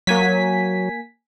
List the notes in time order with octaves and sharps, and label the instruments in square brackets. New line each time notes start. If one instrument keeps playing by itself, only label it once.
[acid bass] F#3 [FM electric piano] A#3 G#5 B6